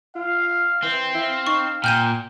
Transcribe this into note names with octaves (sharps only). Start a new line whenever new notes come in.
F4 F5
E3 C4
E4 F5
D#4 C#6
A#2 G5 F6 G6 D#7